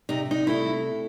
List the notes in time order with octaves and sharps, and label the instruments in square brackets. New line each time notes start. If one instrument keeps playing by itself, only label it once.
[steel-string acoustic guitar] C3 D#4
D#4
A3 E4